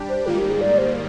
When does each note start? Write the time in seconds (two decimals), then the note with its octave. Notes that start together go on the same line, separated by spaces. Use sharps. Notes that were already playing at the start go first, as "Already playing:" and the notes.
Already playing: G3 D4 G4
0.09 C5
0.27 G#2 D#3 G3 A#3 F4
0.38 G4
0.50 G#4
0.61 D5
0.78 C5